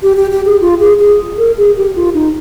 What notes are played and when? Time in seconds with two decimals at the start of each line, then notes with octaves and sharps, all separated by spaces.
0.03 G4
0.17 G4
0.31 G4
0.46 G#4
0.61 F4
0.80 G#4
0.99 G#4
1.38 A#4
1.58 G#4
1.77 G4
1.96 F4
2.14 D#4